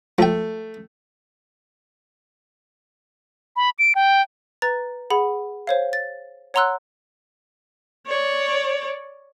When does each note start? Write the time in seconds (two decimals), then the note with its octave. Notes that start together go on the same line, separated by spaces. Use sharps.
0.19 F3 A3 G5
3.56 B5
3.79 D7
3.95 G5
4.62 B4 A#5 A6
5.10 G#4 F#5 B5
5.67 C5 C#5 F5
5.93 A6
6.54 C#5 F#5 A#5 C6 E6 F#6
8.07 C#5 D5